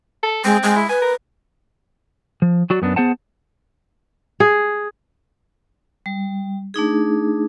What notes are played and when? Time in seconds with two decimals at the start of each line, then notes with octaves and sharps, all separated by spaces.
0.23 A4
0.45 G#3 C4
0.63 G#3
0.76 E4
0.89 B4 G#5
1.02 A#4
2.42 F3
2.70 F#3 F#4 D5
2.82 F#2 B3 D4
2.96 B3 G#4 C5 F#5 A5
4.40 G#4
6.06 G3
6.74 A3 D4 D#4 G#4